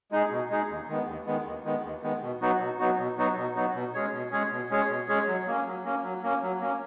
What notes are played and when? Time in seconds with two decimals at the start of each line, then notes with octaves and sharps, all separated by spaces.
0.11 G#3 D#4 G#4
0.31 B2
0.50 G#3 D#4 G#4
0.69 D#2
0.89 D#3 G#3 B3
1.07 D#2
1.26 D#3 G#3 B3
1.45 D#2
1.65 D#3 G#3 B3
1.84 D#2
2.02 D#3 G#3 B3
2.22 B2
2.41 F#3 B3 D#4 F#4
2.60 B2
2.79 F#3 B3 D#4 F#4
2.98 B2
3.17 F#3 B3 D#4 F#4
3.37 B2
3.55 F#3 B3 D#4 F#4
3.74 B2
3.94 G#3 C#4 G#4 C#5
4.13 B2
4.32 G#3 C#4 G#4 C#5
4.51 B2
4.71 G#3 C#4 G#4 C#5
4.90 B2
5.08 G#3 C#4 G#4 C#5
5.27 F#3
5.47 A#3 C#4
5.66 F#3
5.85 A#3 C#4
6.04 F#3
6.23 A#3 C#4
6.43 F#3
6.60 A#3 C#4